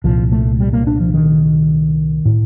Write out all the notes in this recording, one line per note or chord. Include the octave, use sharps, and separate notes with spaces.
C2 A#2 F3
A3
G3
A#3
D4
F3
D#3
A2